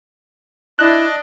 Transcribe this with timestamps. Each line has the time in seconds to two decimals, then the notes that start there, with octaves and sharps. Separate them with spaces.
0.79 D4 E4 D#5 F#6